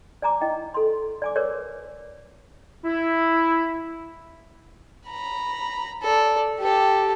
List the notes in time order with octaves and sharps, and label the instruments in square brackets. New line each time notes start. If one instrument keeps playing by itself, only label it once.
[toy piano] D5 G#5 A#5 D6
E4 D#5 G5
A4 C6
D5 G#5 D6
A#4 B4 C#5 D5
[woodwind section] E4
[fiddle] A#5 B5
A4 D5
G4 A4